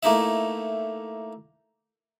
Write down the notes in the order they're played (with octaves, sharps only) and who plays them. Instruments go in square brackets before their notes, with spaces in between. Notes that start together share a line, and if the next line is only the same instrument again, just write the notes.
[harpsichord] A3 A#3 D#4 E4 E5